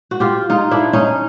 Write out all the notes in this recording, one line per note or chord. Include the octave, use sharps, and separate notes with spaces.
F#4
F4 G4
D#4 F4
D4 E4
C#4 D#4